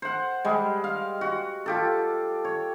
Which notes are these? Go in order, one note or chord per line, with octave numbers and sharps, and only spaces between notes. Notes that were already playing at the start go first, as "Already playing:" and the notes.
C5 F#5
G3 G#3
F5
F#4
F4 G4 A4
C#5